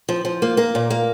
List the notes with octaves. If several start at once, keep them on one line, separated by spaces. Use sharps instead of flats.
F3
F3
A#3
A#3 A#4
A#2
A#3